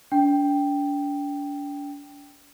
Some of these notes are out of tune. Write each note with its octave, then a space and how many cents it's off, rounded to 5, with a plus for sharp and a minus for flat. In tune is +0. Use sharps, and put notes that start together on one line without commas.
D4 -40 G5 +0